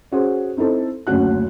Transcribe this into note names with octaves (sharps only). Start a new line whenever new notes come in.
C#4 F#4 G#4 C5
C4 D#4 E4 A4 C5
F#1 D2 C#4 F#4 F#6